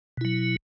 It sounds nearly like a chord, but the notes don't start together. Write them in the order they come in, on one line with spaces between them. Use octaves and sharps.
B2 E4 F#3